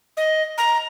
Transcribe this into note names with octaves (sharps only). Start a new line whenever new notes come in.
D#5
A#5